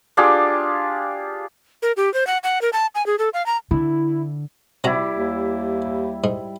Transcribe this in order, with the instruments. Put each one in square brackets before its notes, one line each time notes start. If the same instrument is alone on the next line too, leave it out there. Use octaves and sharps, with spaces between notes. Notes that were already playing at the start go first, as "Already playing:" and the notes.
[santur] D4 F4 G4 G#4
[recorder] A#4
G4
C5
F#5
F#5
A#4
A5
G#5
G#4
A4
F5
A#5
[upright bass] D3 [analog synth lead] E4
[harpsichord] C3 F#4 A#5 [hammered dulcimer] G3 E4
[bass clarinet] D#2
[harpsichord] G#2